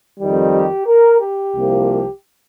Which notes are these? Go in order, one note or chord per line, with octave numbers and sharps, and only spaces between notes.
F2 D#3 G3
G4
A#4
G4
C2 C3 F3 A#3